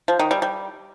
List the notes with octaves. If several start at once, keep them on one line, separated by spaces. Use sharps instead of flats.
F3
D#3
G3
G3